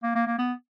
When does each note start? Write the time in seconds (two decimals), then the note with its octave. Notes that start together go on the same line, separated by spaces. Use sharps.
0.03 A#3
0.15 A#3
0.27 A#3
0.39 B3